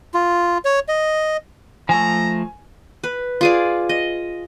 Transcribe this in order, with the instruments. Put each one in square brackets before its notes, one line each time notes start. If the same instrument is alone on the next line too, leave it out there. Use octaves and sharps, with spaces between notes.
[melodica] F4
C#5
D#5
[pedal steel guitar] F3 A3 [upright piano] G#5 [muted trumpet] A#5
[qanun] B4
F4 G#4 D5
D#5